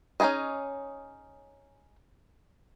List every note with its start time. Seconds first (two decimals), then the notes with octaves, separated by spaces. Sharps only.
0.20 C#4 D#4 E4 G#4 D#5